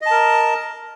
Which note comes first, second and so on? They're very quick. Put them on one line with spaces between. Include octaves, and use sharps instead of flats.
D#5 A5 A#4